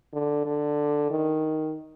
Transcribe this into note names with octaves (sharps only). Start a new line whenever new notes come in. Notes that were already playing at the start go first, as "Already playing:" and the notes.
D3
D3
D#3